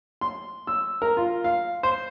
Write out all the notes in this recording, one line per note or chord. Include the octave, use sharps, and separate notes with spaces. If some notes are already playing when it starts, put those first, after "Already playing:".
C6
E6
A#4
F4
F5
C5